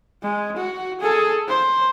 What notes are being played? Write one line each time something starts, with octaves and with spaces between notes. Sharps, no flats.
G#3
F#4
G#4 A4
C5